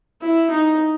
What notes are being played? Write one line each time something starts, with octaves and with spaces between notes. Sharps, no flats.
E4
D#4